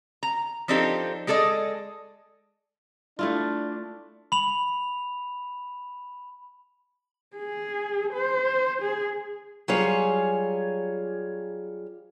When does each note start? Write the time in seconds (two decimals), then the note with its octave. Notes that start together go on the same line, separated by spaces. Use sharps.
0.23 A#5
0.68 F3 C4 D4 D#4 G4 A4
1.27 G#3 G#4 A4 D5 D#5
3.19 A3 D4 E4 F4
4.32 B5 F7
7.37 G#4
8.14 C5
8.82 G#4
9.68 F#3 G3 C#4 F4 G#4 C#5